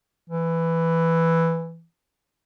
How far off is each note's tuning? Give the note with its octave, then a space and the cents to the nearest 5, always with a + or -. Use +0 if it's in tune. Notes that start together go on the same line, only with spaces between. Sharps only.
E3 +5